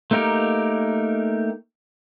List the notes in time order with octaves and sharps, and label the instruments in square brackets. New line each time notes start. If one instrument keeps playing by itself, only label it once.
[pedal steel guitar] A3 A#3 D#4 G4 A#4